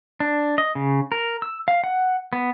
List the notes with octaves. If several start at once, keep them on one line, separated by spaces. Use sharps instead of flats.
D4
D#5
C#3
A#4
E6
F5
F#5
B3